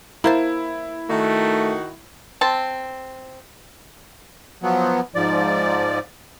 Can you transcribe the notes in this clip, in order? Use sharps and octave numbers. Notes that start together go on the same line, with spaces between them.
A#3 E4 C5 A5
D#3 A3 F#4
C4 A5
F3 F#3 B3
G#2 F3 D5